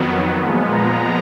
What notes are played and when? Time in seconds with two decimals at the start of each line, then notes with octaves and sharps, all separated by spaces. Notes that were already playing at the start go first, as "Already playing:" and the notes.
Already playing: F2 D#3 F#3 B3
0.40 A#2 F3 G#3 B3
0.71 A#5